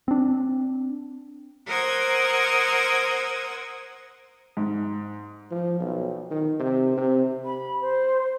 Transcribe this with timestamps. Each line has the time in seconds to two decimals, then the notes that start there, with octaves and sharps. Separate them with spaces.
0.08 C4 D4
1.66 A#4 C5 F#5 D#6 E6 G#6
4.57 G#2
5.51 F3
5.80 B1
6.30 D#3
6.60 C3
6.97 C3
7.45 B5
7.81 C5